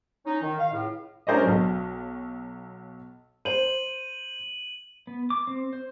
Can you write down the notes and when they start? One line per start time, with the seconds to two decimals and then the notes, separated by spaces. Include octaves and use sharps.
0.25 C#4 D#4
0.42 D#3
0.58 F5
0.72 C#2 A2
1.27 C#4 D4 A#4 C5 D5 D#5
1.42 B1 F#3
3.45 C5 D#7 F#7
5.07 B3
5.30 D6
5.47 C4
5.73 C5